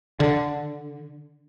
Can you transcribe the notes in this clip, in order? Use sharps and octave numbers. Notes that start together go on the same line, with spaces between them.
D3